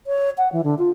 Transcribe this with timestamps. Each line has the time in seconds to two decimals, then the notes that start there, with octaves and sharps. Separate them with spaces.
0.07 C#5
0.38 F#5
0.52 E3
0.64 D3
0.78 F4